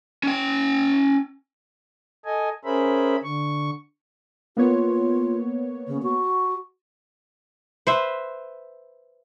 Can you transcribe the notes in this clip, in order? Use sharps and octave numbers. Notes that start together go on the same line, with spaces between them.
C#4 G5
A4 D#5 G#5
C#4 G#4 A#4 C5 E5 B5
D3 C#6
A#3 B3 F4 C#5
C#3
F#4
B4 C5 E5